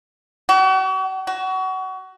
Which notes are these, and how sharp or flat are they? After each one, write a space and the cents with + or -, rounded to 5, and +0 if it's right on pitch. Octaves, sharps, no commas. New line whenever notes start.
F#4 +40
F#4 +25